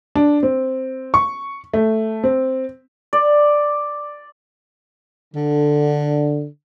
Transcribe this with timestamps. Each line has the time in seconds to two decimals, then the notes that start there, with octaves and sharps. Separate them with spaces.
0.15 D4
0.43 C4
1.14 C#6
1.73 A3
2.24 C4
3.13 D5
5.34 D3